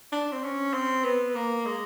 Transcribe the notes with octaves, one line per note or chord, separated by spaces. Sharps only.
D4
C4
C#4
C4
B3
A#3
G#3